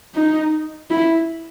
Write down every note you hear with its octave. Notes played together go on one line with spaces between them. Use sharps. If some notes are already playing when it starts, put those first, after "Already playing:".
D#4
E4